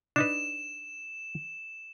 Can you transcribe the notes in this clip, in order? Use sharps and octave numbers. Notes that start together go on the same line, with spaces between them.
D4 D#4 B4 E7